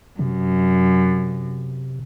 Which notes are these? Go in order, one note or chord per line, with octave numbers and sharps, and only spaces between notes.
F#2 C3